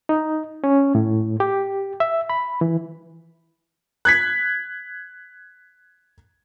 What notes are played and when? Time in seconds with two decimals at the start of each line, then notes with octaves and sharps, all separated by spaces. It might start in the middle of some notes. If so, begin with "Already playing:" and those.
0.09 D#4
0.64 C#4
0.95 A2
1.40 G4
2.00 E5
2.30 B5
2.61 E3
4.05 F#6 G#6 B6